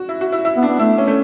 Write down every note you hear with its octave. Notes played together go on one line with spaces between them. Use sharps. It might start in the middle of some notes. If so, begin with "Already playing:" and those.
Already playing: F#4
E4
F#4
E4
E4
B3
D4
B3
A3 E4
C#4
A3